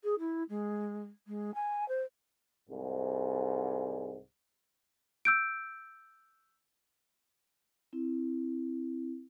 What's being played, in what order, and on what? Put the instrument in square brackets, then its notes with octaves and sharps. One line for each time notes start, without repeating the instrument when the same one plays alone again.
[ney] G#4
E4
G#3
G#3
G#5
C5
[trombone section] C2 G#2
[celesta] E6 G6 D7
[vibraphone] C4 E4